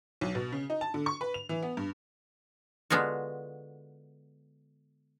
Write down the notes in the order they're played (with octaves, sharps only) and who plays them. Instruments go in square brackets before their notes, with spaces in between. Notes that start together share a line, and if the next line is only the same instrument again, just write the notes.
[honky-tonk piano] B1
B2
C#3
D#4
A5
D3
C#6
B4
F7
E3
B3
G2
[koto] D3 G#3 B3 F4 F#4